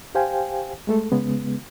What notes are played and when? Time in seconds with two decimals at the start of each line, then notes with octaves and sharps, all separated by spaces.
0.15 G4 C5 F5 G5 G#5
0.87 G#3 A3 A4
1.12 C#3 G#3 B3